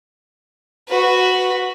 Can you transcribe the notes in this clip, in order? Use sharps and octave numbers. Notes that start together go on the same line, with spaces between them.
F#4 B4